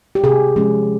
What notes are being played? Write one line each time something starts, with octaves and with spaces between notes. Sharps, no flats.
G4
C3 G#4
F3 G#3 C#4